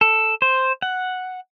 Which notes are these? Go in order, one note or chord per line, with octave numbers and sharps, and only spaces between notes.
A4
C5
F#5